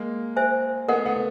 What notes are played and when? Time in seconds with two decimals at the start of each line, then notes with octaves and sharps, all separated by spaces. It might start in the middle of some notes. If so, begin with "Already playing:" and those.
Already playing: G#3 A#3
0.36 C5 E5 G#5
0.88 A3 B3 A#4 D#5 F#5
1.06 A3 B3